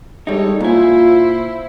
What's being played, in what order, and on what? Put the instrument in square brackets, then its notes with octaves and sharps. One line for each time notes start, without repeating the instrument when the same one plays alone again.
[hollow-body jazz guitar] G3 D#4 [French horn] G#3 [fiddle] A4 C#5
[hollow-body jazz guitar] A#2 G#5 [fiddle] E4 C5 [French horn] F4